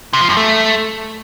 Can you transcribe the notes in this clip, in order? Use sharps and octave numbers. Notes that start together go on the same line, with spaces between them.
C3
F3
F#2
A3